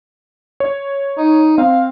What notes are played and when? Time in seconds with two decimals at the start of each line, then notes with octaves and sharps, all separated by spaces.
0.60 C#5
1.18 D#4
1.58 C4 F5